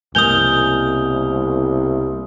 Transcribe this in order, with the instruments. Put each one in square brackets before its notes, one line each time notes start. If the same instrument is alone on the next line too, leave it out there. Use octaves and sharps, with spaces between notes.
[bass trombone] C2 [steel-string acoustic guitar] B2 A#3 [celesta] G#5 G6 F7 [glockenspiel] D#6 G7